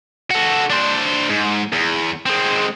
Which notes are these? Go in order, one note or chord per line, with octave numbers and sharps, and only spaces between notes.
F#4 A4
D4 C5
G#2
E2
G#3 C4